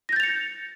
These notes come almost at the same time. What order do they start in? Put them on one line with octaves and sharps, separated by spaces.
A#6 G6 A6 F7 C#7